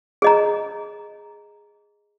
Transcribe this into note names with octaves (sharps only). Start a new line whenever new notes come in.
G#4 D#5 A#5